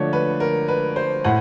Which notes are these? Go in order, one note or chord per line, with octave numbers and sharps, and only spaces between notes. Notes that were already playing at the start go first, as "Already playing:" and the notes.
Already playing: D3 F3 A3 C#5 D5
B4
A#4
B4
C5
A2 F#5